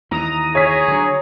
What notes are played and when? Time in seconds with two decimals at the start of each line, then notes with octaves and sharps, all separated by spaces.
0.11 D#2 E3 A#5 D#6
0.55 G#4 C#5 B6
0.88 D3 F#3